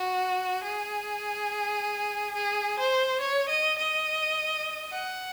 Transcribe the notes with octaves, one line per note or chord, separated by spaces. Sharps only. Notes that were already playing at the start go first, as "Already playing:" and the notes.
Already playing: F#4
G#4
G#4
C5
C#5
D#5
D#5
F#5